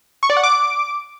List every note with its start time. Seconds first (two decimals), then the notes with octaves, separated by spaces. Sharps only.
0.23 C#6
0.30 D5
0.37 F#5
0.43 D6